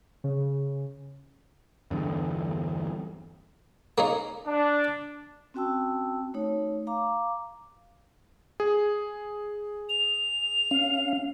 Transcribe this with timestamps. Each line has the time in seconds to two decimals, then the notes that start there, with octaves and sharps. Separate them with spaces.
0.24 C#3
1.91 E2 G2 D3
3.98 A#3 C#4 D#4
4.47 D4
5.54 C4 C#4 F#4 G5 A5 E6
6.34 A3 D#4 C#5
6.87 F5 A#5 D6
8.60 G#4
9.89 F7
10.71 C#4 F5